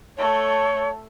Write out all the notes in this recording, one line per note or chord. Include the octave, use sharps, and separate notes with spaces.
A3 A4 C#5